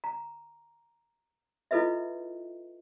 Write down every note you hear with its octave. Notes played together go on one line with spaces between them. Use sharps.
A#5
E4 F4 A4 B4 D#5 E5